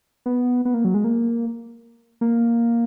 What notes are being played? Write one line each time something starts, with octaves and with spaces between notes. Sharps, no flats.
B3
B3
A#3
F#3
G#3
A#3
A#3